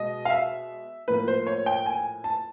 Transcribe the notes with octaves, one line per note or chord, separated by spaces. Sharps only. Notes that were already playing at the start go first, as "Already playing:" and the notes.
Already playing: B2 G#3 D#5
F5
E5
A2 F3 A#3 B4
C5
C#5
G5
G#5
A5